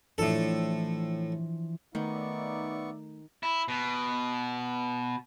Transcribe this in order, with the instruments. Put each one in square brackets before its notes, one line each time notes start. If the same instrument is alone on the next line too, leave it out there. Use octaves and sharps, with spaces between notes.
[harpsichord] A2 A4 [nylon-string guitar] E3 F3 D4
[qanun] D#3 [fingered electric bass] A3 [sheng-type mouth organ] B3 C#6 [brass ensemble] D#4 D5 E5
[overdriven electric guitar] E4
B2